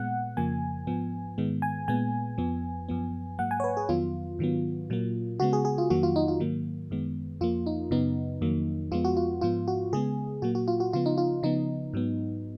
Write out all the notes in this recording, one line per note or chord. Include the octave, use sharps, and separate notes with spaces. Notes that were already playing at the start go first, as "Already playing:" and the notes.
Already playing: A#2 G#3 B3 F#5
F2 C#3 F3 A#3 G#5
G#2 F3 B3
G#2 D#3 G#3 B3
G#5
A#2 G#3 B3 G#5
F2 F3 B3
F#2 F3 B3
G#2 F#3 A#3 F#5
G#5
C#5
B4
G#4
F2 D#3 F#3 B3 F4
G#2 D#3 F#3 B3
A#2 F#3 A#3
C#3 G#3 B3 F#4
G#4
G#4
F4
F2 D#3 F#3 A#3 F#4
F4
D#4
F4
G#2 D#3 F#3 A#3
F#2 D#3 G#3 B3
F2 F3 A#3 F4
D#4
F#2 C#3 F#3 B3 D#4
F2 D#3 F#3 A#3
F2 F3 G#3 B3 F4
F#4
F4
G#2 F3 B3 F4
F#4
C#3 G#3 B3 G#4
A#2 F#3 A#3 F#4
F#4
F4
F#4
C#3 F3 B3 F4
D#4
F4
C#3 F3 B3 D#4
G#2 F#3 B3